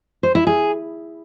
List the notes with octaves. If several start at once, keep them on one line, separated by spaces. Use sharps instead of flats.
C5
E4
G#4